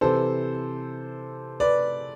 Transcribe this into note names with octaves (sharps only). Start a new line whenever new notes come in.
C3 E3 A4 C5
B4 D5